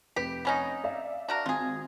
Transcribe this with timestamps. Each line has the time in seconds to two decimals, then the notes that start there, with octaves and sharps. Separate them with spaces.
0.16 F1 G4 B4 B6
0.45 B3 C#4 D#4
0.84 D5 E5 F5
1.29 D4 F#4 A#4
1.46 G#1 F4 G#4